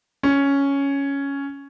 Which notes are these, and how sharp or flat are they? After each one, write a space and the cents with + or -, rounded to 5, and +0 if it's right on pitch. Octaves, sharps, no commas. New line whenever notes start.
C#4 +5